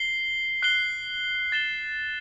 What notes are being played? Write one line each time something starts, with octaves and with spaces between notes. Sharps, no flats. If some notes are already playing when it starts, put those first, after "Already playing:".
Already playing: C7 G7
F#6 C7 G7
A6 E7 G7